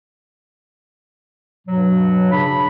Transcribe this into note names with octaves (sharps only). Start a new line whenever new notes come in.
G2 B2 F#3
C#3 D4 B5